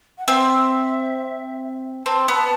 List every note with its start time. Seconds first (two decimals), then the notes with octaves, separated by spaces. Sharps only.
0.18 F#5
0.27 C4 E5
2.06 C4 A5
2.28 B3 B5
2.35 A5